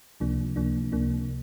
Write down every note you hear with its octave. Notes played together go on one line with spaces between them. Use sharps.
C#2 C3 F3 A#3 D4
C#2 C3 F3 A#3 D4
C#2 C3 F3 A#3 D4